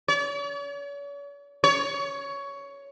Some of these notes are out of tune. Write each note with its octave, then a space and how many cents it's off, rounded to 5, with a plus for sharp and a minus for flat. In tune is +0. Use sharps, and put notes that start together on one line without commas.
C#5 +45
C#5 +15